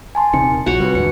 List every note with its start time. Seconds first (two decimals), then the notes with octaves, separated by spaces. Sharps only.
0.15 G#5 A5 C6
0.33 D#1 C3 D#3 C#7
0.66 A#1 F4 F#4 C#5
0.80 C3 G3 B4
0.95 D#2 G#2 D3 C#7